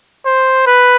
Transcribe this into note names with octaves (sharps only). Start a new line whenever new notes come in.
C5
B4